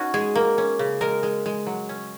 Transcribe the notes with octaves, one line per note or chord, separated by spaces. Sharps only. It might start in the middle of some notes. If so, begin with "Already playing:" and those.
Already playing: C#4 D#4 F#4
G#3 G#4
A#3
C#4
C#3
G#3 A#4
G#3
G#3
F#3
C#4